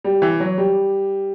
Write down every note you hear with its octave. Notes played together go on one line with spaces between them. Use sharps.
G3
E3
F#3
G3